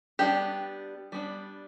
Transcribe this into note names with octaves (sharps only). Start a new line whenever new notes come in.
G3 B3 D4 G4
G3 B3 D4